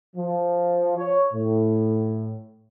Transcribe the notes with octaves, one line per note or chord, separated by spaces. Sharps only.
F3
C#5
A2